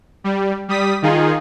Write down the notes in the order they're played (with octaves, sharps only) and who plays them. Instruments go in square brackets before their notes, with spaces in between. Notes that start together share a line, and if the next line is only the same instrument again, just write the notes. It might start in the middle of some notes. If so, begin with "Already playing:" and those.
[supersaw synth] G3
G3 D#6 B6
D#3 D#4 F4 G#4